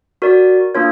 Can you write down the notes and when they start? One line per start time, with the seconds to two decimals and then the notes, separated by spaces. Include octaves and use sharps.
0.22 F#4 A#4 D5
0.75 A#3 D4 F4 A#4 C#5